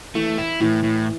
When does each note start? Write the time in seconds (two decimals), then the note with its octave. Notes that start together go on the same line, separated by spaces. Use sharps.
0.15 E3 A3
0.38 E4
0.60 A2 E3
0.83 A2